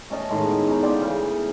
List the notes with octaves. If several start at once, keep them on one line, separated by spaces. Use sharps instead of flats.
A3 C#4 D#5 A5
A2 D#3 G#3 A3
B3
C#4 D#4
B3 F4 D5 G5
C#3 E3